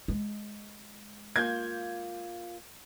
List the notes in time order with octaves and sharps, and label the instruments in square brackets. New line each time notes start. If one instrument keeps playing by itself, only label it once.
[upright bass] G#3
[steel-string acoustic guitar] A#3 F4 [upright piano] G6 G#6